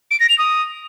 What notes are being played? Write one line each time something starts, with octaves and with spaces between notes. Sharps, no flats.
D7
A#6
F7
D#6